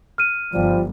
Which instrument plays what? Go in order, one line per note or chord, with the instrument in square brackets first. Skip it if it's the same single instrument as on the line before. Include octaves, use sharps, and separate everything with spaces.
[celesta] F6 D#7
[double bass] G1 [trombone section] F3 G3